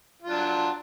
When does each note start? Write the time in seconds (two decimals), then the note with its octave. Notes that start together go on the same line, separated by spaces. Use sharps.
0.22 F4
0.26 F#3
0.30 D4